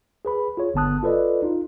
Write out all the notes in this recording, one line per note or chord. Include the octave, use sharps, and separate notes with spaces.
G#4 B4 B5
F4 G#4 C#5
G1 D3 B3 A5 D#6 F#6
F4 A4 B4 D5 D#5
D#4 F4